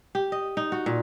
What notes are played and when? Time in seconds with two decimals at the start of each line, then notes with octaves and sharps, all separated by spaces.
0.15 G4
0.32 D#5
0.57 D#4
0.72 F#4
0.86 A#2